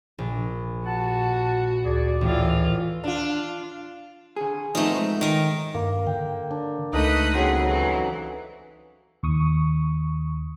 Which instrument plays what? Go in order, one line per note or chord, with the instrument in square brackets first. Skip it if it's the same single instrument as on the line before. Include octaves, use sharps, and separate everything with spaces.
[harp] A#1 [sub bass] A#2
[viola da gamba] F#4 [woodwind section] F#5 A5
[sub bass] D2 [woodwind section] G#4 D5
[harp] A1 [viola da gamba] E3 F4
[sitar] D4 F4
[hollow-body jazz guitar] D3 G#4
[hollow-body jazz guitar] F3 B3 C4 [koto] A3 D#4
[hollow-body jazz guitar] G#2
[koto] D#3 A#4
[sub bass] G2 [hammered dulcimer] A#3
[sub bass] D3 [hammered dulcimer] G5
[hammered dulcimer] D4
[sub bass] C#2 [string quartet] A3 B4 D#5 [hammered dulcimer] D#4 A4
[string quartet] D#2 G#4 [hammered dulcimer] C#3 C4 F#4
[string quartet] E3 F#3
[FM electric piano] D#2 C#6 D#6